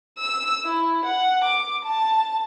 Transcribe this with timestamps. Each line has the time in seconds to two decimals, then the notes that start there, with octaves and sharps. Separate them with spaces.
0.18 E6
0.65 E4
1.05 F#5
1.44 D6
1.84 A5